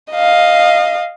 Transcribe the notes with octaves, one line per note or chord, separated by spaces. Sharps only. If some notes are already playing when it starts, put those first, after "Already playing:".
D#5 F5